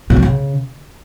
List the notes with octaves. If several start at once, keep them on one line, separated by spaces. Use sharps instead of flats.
B2
G2
C#3